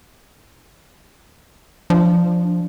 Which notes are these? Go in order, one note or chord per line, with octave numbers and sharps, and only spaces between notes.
F3 D4